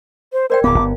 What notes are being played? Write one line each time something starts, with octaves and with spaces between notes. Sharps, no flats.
C5
A#4 C5 D5 G5
D1 B3 F5 D6
G1 B3